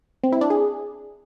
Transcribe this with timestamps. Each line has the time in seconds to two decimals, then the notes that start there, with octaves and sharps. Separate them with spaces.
0.24 C4
0.32 E4
0.41 D4
0.50 G#4